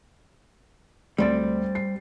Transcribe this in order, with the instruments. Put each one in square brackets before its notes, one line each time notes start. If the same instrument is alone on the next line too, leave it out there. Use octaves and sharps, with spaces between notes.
[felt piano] D2 A6 [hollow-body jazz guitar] G3 C4
[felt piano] C7